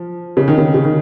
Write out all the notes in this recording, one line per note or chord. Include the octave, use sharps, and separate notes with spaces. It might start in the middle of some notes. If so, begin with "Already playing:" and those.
Already playing: F3
C#3
D#3
C#3
C#3
D#3